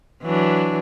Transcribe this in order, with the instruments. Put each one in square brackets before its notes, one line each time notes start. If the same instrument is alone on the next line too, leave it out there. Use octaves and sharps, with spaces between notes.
[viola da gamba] E3 F#3 D4